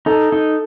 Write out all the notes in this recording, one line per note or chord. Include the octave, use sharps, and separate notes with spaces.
D#4 A4
D#4